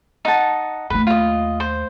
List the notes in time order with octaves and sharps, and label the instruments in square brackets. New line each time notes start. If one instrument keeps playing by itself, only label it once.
[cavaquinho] D#4 F#5 A5
[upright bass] D#2 A3 [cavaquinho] B4
[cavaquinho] F4 D#5
C5